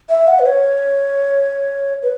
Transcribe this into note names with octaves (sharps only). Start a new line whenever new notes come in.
E5
F#5
B4
C#5
B4